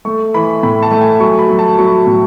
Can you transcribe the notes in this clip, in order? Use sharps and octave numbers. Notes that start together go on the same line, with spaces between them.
A3 C#6
E3 B5
A2 B5
A5
A3
G#5
F#3 C#6
B5
F#3
A5
F#3 C#6
A2